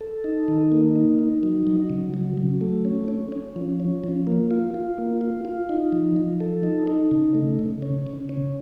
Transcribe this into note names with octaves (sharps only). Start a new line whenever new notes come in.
A4
D#4
D#3
A#3
D#4
D#4
F#3
F#3
C#3
F#3
F#3
A3
C#4
C#4
C#4
F3
C#4
F3
A#3
F4
F4
A#3
F4
F4
D#4
F3
F3
A4
D#4
D#4
C#3
A3
C#3
C#4
C#3
C#4